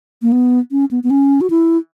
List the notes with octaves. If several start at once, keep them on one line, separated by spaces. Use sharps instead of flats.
A#3
B3
C#4
B3
B3
C#4
F#4
E4